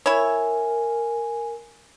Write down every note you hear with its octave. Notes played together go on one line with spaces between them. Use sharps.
E4 A#4 C#5 G#5